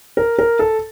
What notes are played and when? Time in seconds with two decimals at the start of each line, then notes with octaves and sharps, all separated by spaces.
0.17 A#4
0.39 A#4
0.59 A4